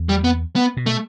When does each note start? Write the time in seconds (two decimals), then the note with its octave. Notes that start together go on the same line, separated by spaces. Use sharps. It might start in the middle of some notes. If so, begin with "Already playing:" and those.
Already playing: E2
0.09 G3
0.24 B3
0.56 B3
0.77 B2
0.86 A3